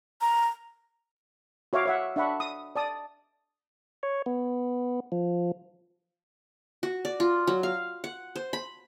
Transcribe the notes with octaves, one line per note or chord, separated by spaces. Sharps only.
A#5
F#4 C#5 E5 F5 D6
C#5 E5 F#5
D4 E5 F#5 B5 C#6
D#6
D5 A5 D#6
C#5
B3
F3
F#4
D5
F4
F#3
F5
F#5
C5
B5